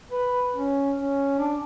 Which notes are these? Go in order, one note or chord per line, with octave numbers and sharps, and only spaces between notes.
B4
C#4
C#4
D4